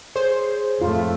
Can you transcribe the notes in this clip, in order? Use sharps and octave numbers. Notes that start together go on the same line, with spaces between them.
G#4 C5 C#5
F2 A2 A3 F4